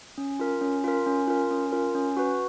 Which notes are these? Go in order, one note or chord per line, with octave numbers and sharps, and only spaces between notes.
C#4
F4 A#4
C#4
F4 A#4
C#4
F4 A#4
C#4
F4 A#4
C#4
F#4 B4